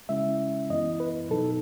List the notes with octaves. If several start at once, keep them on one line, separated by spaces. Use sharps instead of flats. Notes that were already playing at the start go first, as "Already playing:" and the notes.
C#3 G#3 C#4 E4 E5
F#2 E3 B3 E4 D#5
B4
B2 F#3 B3 D#4 A4